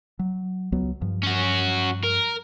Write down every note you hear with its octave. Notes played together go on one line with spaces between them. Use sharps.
F#3
C#2 F#3 B3
G2 F3
C#4 F#4
A#4